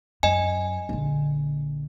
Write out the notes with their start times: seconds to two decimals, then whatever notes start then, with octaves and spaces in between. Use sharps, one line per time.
0.23 F#2 D#5 G#5
0.89 A#1 D3